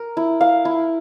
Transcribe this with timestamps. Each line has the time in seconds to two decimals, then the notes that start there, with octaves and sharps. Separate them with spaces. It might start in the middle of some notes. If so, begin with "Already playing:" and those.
Already playing: A#4
0.17 E4
0.41 F5
0.65 E4